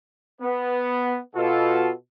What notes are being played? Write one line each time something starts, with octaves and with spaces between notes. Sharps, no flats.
B3
B2 F4 A4